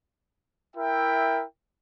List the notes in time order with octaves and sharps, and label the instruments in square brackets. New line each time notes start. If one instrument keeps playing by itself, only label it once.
[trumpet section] E4 A#4 E5 G5